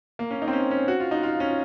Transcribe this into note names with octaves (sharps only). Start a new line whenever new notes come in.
A#3
C#4
D#4
C4
C#4
C#4
F#4
F4
D#4
F4
C#4